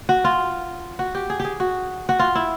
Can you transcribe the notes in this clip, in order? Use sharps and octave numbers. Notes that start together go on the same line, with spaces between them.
F#4
F4
F#4
G4
G#4
G4
G#4
F#4
F#4
F4
E4